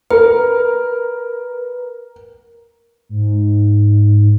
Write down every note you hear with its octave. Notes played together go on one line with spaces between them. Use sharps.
A#4 B4
G#2